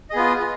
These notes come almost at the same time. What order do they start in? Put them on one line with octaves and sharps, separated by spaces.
D#5 G#4 B3 F4